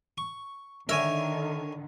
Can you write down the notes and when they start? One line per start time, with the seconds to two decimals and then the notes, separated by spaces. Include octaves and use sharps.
0.18 C#6
0.89 D3 D#3 A#4 C#5 E5 G#5